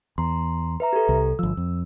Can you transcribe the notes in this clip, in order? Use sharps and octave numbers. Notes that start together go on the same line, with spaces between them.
E2 A#5 C6
B4 E5 A#5
G4 A4
C2
G1 F3 E6
F2